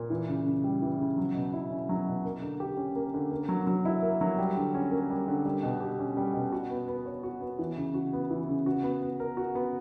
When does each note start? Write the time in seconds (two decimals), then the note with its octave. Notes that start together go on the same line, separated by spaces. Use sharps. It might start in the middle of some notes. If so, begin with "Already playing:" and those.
Already playing: A#2
0.10 E3
0.29 C#3
0.45 C#3
0.64 G3
0.82 E3
1.00 C#3
1.18 F#3
1.35 B2
1.53 E4
1.70 C#4
1.89 F#3
2.07 B2
2.25 A#3
2.42 D3
2.60 G4
2.77 C#4
2.96 A#3
3.14 D3
3.31 A#3
3.49 F#3
3.67 F#3
3.85 E4
4.02 A#3
4.21 F#3
4.38 G3
4.56 D3
4.74 C#4
4.91 A#3
5.10 G3
5.28 D3
5.45 G3
5.63 B2
5.80 G4
5.99 C#4
6.17 G3
6.34 B2
6.52 F#4
6.70 B3
6.88 B3
7.06 C#5
7.23 F#4
7.41 B3
7.59 E3
7.77 C#3
7.94 F#4
8.13 B3
8.30 E3
8.49 C#3
8.66 F#4
8.83 B3
9.02 B3
9.20 A#4
9.37 F#4
9.55 B3